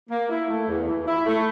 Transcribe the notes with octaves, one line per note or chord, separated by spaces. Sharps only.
A#3
E4
A3
E2
E3
E4
A3